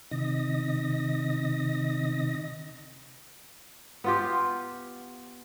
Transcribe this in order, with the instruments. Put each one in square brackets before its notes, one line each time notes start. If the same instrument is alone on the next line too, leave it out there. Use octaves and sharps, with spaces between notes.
[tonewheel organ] C3 D#3 D#5 A#6
[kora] B3 F4 G4